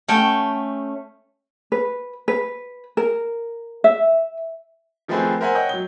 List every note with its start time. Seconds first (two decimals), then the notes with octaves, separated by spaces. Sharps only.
0.08 A3 C#4 G5
1.72 B4
2.28 B4
2.97 A#4
3.84 E5
5.08 D#3 F3 A3 C4 G#4 B4
5.41 A#4 C5 E5 F#5 G#5
5.55 C#5 D#5 F#5 G5 G6
5.69 F#3 G7